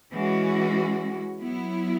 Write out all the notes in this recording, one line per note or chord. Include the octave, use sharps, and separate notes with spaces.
E3 G#3 C#4 F#4
F#3 B3 E4